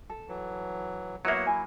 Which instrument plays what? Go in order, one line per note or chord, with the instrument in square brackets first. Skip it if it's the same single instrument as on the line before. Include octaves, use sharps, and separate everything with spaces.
[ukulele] A4
[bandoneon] E3 F#3
[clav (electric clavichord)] F#3 A#3 [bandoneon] B3 C#5 F#5 [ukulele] E4 E5
[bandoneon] E4 [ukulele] G#5